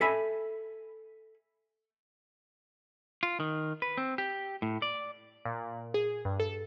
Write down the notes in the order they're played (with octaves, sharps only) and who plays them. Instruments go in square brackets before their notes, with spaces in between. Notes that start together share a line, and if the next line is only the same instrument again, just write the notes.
[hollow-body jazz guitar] A4 E5 G#5 B5
[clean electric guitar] F4
D#3
B4
C4
G4
A2
D5
[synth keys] A#2
G#4
G2
A4